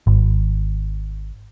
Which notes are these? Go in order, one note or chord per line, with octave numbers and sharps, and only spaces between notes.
G#1